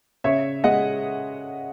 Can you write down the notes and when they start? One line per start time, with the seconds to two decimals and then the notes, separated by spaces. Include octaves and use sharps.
0.24 C#3 C#5 E5
0.64 G#3 D#5 F#5